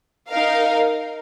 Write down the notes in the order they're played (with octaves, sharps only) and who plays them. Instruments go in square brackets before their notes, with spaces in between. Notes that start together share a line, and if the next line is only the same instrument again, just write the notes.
[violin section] D#4 A#4 F5